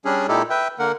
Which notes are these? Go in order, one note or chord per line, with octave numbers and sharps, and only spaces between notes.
G3 C#4 D4 G#4
A#2 G#3 D#4 E4 G4 A4
B4 E5 G5
D3 A#3 A#4 F#5